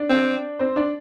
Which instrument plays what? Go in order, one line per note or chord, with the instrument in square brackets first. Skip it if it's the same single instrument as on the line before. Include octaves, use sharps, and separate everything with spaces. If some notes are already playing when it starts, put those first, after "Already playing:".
Already playing: [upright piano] D4 D5
[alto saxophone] C4
[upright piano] C4 C5
D4 D5